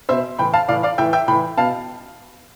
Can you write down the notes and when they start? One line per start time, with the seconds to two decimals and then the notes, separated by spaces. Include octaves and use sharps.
0.09 B2 C5 E5
0.38 A2 E3 G5 B5
0.53 F5 A5
0.68 A2 E3 D5 F5
0.83 D5 F5
0.98 A2 E3 E5 G5
1.13 E5 G5
1.28 A2 G5 B5
1.32 E3
1.58 B2 F5 A5